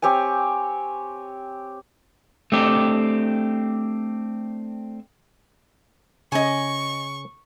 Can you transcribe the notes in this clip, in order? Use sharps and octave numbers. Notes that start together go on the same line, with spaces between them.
C4 G4 C#5 G#5
A3 C4 D4 G4
C#3 C#4 D#5 G#5 C#6